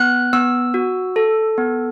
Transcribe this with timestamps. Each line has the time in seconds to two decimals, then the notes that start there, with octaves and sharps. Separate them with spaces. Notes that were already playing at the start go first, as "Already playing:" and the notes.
Already playing: B3 F#6
0.33 B3 E6
0.74 F#4
1.16 A4
1.58 B3